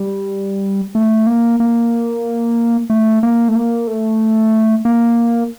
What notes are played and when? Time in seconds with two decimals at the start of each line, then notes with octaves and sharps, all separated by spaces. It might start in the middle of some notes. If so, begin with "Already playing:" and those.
Already playing: G3
0.95 A3
1.27 A#3
1.60 A#3
2.90 A3
3.23 A#3
3.48 A3
3.56 A#3
3.87 A3
4.85 A#3